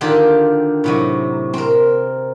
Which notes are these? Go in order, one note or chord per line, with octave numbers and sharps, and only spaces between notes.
D3 D#3 F4 G4 G5
A2 C3 F#3
C4 A#4